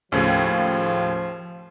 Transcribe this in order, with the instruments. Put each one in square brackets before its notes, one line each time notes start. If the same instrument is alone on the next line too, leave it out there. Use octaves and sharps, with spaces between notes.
[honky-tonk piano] D#2 A2 C#3 [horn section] F3